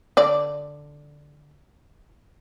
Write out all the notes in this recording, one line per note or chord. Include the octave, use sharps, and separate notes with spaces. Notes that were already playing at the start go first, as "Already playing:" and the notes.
D3 D5